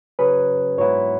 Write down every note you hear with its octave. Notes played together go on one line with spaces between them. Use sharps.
C#3 F#3 C#4 G#4 B4
G#2 F#3 B3 E4 C#5